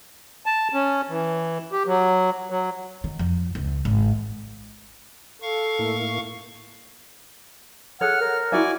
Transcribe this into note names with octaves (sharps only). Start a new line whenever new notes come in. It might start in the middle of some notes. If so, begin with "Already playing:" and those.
A5
C#4
E3
G4
F#3
F#3
D#3
F2
C#2
G#1
A4 F5 C#6
A2 A#3 E4
G#4 A4 C#5 F#5 F6
A#4
E4 F#4 D5 E5 G#5